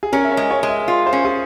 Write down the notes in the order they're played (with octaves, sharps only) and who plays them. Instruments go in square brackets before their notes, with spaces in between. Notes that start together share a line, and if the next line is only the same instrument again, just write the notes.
[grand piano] G#4
[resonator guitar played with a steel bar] C#4 [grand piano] A#4
[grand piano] E5
C#5
[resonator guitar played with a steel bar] G#3
[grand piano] C#5
[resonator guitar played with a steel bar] G#3
[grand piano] E5
[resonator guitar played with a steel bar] F4
[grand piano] C5
[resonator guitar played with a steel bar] C#4
[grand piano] G#4